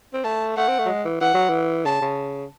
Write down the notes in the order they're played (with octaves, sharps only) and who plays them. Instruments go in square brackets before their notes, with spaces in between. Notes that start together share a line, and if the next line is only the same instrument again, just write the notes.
[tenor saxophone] C4
[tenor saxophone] A3 [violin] A5
[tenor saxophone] A3 [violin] F#5
[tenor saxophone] C4
A3
F#3
G#3
E3
[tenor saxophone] E3 [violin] F#5
[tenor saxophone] F#3
E3
[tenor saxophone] C#3 [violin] A5
[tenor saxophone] C#3